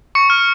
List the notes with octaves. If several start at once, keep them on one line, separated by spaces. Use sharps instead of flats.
C#6 C#7
F6